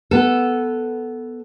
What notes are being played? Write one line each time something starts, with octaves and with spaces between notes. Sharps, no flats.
B3 A4